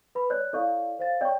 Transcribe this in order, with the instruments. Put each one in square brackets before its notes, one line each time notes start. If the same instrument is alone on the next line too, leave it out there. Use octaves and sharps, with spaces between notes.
[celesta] B4 B5
[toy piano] C#5 D5 [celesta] F#6
[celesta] E4 F5 [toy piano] A4 D5 C#6
[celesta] C5 F5 A6
[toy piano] C#5 D5 [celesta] G5 C#6